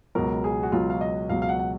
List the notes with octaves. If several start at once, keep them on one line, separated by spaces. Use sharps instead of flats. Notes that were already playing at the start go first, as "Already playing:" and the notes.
C#2 B2 F#3 A#4
G#4
F#4
C#2 B2 F#3 F4
F5
D#5
C#2 B2 F#3 F5
F5
F#5
F#5